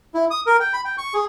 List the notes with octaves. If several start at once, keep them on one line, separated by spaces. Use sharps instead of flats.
E4
D#6
A#4
G5
B5
G5
C#6
G#4